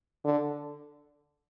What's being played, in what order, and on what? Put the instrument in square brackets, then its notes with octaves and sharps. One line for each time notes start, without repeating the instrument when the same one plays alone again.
[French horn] D3